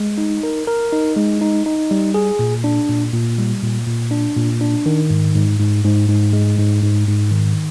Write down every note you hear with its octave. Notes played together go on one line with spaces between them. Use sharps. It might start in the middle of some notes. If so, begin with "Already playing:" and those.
Already playing: G#3
D#4
A#4
A#4
D#4
G#3
D#4
D#4
G3
G#4
A#2
D4
A#2
A#2
G3
A#2
A#2
D4
A#2
D4
D#3
G#2
G#2
G#2
G#2
G#2
G#3
G#2
G#2
G#2
D#3